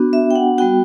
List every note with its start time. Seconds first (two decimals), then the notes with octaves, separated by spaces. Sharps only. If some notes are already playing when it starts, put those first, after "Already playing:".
Already playing: B3 D4 F#4
0.13 E5
0.31 G5
0.35 F#5
0.58 G3 B3 F#4 G5